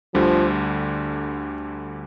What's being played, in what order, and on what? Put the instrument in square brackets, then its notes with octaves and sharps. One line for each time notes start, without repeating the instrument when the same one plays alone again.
[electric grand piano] D2 D3 G3 [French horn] F3